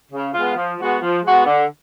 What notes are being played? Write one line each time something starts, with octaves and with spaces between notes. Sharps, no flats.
C#3
G#3 B3 F4
F3
G#3 B3 F#4
F3
G#3 B3 F#4
D3